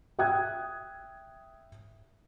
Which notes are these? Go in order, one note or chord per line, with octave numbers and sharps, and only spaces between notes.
E5 G5 D#6 F#6 G#6